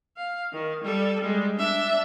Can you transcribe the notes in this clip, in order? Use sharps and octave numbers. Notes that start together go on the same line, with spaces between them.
F5
D#3
G3 A4
G3 G#3
D4 E5